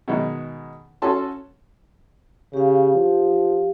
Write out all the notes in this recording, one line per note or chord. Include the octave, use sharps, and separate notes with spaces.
B2 D#3 G#3 D#4
C#4 F#4 A4 A5 C6
C#3 G4 F5
F3